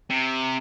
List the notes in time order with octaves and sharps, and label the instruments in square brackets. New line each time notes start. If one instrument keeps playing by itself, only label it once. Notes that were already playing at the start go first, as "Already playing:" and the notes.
[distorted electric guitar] C3